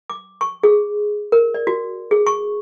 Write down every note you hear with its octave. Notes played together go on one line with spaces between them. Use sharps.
D6
C#6
G#4
A#4
D5
F#4
G#4
C#6